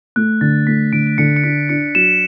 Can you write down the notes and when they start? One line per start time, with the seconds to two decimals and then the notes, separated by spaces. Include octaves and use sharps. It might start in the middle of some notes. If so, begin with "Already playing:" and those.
0.16 A3 F#6
0.41 D3 A6
0.67 A3 B6
0.93 D3 D7
1.07 D7
1.18 D3 C#7
1.36 C#7
1.44 D4 B6
1.69 D4 C#7
1.95 F#3 E7